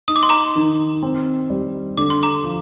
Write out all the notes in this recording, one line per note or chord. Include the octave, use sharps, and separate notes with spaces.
D#4 D#6
D6
C6
A#5 D6
D#3
C4
G3
D3 D6
C6
A#5 D6
F3